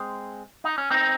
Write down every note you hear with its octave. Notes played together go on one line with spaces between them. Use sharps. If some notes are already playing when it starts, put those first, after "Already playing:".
Already playing: G#3 C4
D#4
C#4
C4 D#4